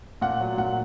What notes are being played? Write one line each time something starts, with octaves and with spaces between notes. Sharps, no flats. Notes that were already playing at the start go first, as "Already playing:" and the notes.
A#2 F#5
F#3
A#2 F#5